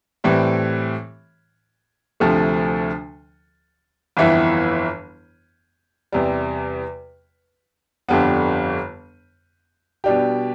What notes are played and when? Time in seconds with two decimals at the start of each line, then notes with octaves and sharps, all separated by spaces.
0.24 A2 E3 G3 C4
2.20 D2 C3 F3 A3
4.17 G1 F2 E3 B3 E4
6.12 E2 C3 G3
8.09 G1 F2 D3 G3 B3
10.04 B2 G3 D4 G4